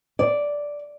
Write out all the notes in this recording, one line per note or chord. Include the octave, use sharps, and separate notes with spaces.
D5